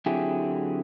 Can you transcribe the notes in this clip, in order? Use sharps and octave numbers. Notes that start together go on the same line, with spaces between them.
D3 F#3 C4 E4 G4 G#4